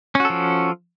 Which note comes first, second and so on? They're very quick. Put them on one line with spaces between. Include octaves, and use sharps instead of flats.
C#4 F#4 A4 F3